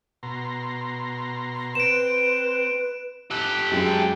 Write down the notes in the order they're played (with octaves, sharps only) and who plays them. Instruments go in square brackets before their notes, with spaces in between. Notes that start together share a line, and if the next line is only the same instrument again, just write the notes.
[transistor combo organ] B2 A#5 C6
[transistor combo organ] C4 [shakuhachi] B4 [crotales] D7 E7
[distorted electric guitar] G4 A4 [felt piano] F#6
[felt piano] F#2 G#3 [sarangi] G5